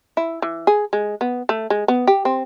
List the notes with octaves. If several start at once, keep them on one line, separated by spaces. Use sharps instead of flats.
E4
E3
G#4
G#3
B3
A3
G#3
B3
G4
C4